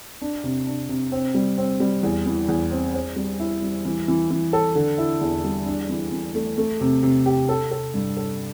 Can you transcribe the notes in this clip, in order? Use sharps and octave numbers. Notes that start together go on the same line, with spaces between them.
D4
C3
D4
C3
C4
G3
C4
G3
E2
E3
E2
C4
C5
G3
E4
G3
E3
E3
E3
A4
D3
E4
E2
G3
D4
E3
E3
A3
A3
C3
C3
G4
A4
A4
G2
A4